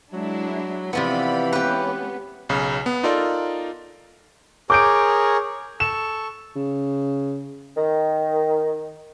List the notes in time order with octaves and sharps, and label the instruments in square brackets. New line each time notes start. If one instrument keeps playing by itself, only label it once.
[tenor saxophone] F#3 [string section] G#3 D4 E4
[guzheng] C3 F3 B3 [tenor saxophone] E3 [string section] D5 B5
[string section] G#3 B3 C#4 [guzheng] G4 B4
[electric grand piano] B1 C#3
B3
D#4 F4 A4 A#4 D5
[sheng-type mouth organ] G#4 A#4 C#5 [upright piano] D6 G6 D7
[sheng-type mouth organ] A4 C#6 [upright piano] E7
[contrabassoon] C#3
[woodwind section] D#3